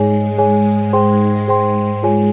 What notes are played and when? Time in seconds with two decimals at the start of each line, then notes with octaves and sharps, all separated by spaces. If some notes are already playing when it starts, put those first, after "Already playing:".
Already playing: G#2 G#3 G#4 C#5 G#5
0.38 G#4 C#5 G#5
0.93 G#4 C5 G5 C6
1.48 G#2 G#3 G#4 C5 G5 C6
2.03 F4 G#4 C#5 G#5